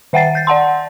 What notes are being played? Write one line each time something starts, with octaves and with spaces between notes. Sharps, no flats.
D#3 E5 F#5 G5 A6 C7
G6 A6
D5 F#5 A5 C6